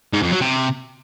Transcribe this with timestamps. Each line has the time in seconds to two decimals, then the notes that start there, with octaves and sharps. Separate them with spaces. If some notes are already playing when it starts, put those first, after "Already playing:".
0.13 G#2
0.23 F2
0.32 F#3
0.41 C3